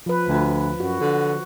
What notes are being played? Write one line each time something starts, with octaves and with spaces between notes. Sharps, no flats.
F3 B4
D2
F#2 F#4
D3